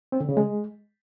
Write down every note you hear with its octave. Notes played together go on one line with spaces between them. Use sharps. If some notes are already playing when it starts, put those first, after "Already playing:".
C4
D3
C#3
G#3